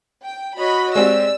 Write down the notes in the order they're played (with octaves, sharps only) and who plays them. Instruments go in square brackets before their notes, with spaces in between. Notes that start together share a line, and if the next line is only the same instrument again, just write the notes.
[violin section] G5
[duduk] F#4 [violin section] C#5 D#5 B5
[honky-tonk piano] G#3 C4 G4 [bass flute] D5 [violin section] E6